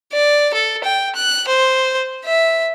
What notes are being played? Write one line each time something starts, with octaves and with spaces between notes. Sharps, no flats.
D5
A4
G5
F#6
C5
E5